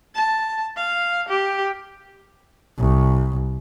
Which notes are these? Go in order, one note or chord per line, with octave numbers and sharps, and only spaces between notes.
A5
F5
G4
C2